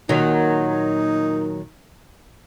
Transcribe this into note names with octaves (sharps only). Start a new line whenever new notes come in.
A#2 D#3 F#3 D#4